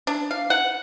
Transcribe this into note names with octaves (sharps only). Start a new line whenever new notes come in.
D4
F5
F#5